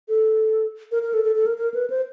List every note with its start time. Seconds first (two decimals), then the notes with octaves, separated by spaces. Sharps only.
0.09 A4
0.92 A#4
1.03 A#4
1.13 A4
1.24 A4
1.35 A4
1.46 A#4
1.57 A#4
1.74 B4
1.90 C5